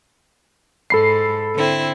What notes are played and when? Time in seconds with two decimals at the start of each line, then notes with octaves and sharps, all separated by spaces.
0.90 G#2 A4 B5 C7
1.55 D3 C4 E4